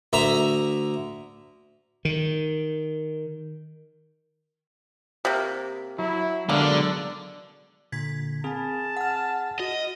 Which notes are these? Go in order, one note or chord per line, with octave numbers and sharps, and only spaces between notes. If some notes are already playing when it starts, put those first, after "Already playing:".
D2 E5 A#5
D#3
C3 A#3
F#3 E4
D3 F#3 G#3 A#3 B3 D4
A#2 D3 G#6 B6
C4 G#4 G#5 A5
F#5 F6
F#4 D#5